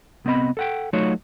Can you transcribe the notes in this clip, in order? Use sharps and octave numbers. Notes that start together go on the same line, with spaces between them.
C2 B3 C4 D#5 B5
A4 F#5 G5
F#3 A3 D#4 F4 F#4 C#5